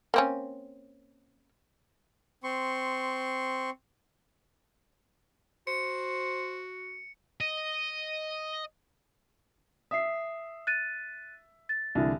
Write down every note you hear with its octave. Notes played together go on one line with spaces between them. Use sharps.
A#3 C4 C#4
C4 C6 C#6
F#4 C5 C#7
D#5
E5 D#6 C7
F#6 A6 D#7
A6
C2 D3 E3